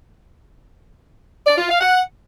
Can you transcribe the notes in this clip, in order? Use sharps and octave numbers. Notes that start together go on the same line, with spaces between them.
D5
F4
F5
F#5